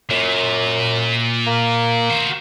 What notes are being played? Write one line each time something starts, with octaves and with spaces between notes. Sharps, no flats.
F#2 A#2
A#3
F#4 C5